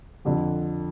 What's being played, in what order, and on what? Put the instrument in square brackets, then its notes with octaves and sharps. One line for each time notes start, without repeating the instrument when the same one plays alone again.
[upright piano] F2 D3 F3